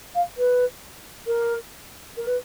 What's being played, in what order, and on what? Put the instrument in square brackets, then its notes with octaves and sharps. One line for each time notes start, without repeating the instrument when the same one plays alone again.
[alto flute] F5
B4
A#4
A#4
B4